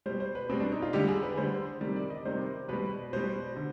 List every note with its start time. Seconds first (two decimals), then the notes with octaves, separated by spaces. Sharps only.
0.06 B2 G3 C5
0.20 C5
0.35 B4
0.49 B2 G3 C4
0.60 D4
0.72 D#4
0.82 F4
0.93 D3 G3 G4
1.08 G#4
1.23 B4
1.37 D3 G3 C5
1.81 C3 D#3 G3
1.96 D5
2.10 D#5
2.25 C3 D#3 G3 C5
2.68 B2 G3 B4
3.13 B2 G3 C5
3.56 D3